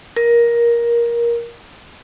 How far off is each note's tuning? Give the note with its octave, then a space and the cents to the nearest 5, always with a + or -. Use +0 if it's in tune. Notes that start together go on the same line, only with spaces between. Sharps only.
A#4 +15